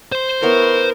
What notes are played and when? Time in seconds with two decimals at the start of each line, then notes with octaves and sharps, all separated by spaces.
0.12 C5 C6
0.42 B3 E4 A#4 C#5